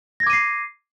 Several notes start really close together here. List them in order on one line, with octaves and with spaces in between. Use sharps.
A#6 G#6 D6 D#7 C7